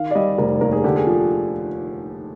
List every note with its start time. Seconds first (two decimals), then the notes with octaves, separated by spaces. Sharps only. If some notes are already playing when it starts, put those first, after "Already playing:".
Already playing: D#3 F5
0.11 D5
0.15 G3 D#5
0.38 F1 A#4
0.61 D#2 A#4
0.73 G#4
0.84 D3 G4
0.96 G#4
1.07 F3